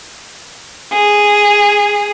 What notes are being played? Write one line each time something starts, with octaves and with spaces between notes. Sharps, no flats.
G#4